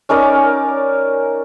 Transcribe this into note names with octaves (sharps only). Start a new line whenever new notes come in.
C#4 D#4 A#4 D5